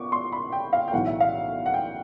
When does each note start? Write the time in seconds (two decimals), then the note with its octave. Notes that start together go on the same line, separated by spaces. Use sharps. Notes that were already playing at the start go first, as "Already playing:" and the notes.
Already playing: A#2 B3 C#6 D6
0.12 C6
0.32 B5
0.52 G5
0.73 F5
0.88 G5
0.92 B1 A2 E3 F#5
1.06 E5
1.20 F5
1.66 F#5
1.74 G5